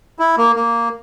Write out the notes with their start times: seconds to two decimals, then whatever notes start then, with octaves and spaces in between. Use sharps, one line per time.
0.19 E4
0.37 A#3
0.56 A#3